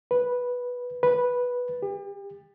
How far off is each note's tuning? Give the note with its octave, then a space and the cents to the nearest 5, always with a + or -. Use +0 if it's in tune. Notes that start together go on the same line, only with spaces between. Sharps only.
B4 -5
B4 -5
G4 +40